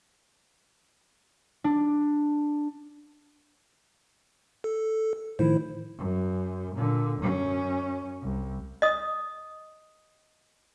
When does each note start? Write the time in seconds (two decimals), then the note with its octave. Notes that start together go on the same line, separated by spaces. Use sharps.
1.64 D4
4.64 A4
5.39 A2 D#3 F3 E4 C5
5.98 F#2
6.75 A#2 D3
7.18 F#2 C#4
8.22 C2
8.82 D#5 D#6